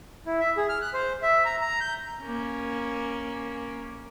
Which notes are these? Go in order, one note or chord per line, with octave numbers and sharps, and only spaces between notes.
E4
E5
G#4
F6
F#6
C5
E5
A#5
A#5
G6
A#3 C#4